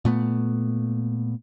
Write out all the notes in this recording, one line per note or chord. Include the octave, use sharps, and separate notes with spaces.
A#2 A3 B3